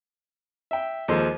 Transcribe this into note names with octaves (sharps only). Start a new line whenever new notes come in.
E5 G5
D#2 F3 G#3 A4 C5 C6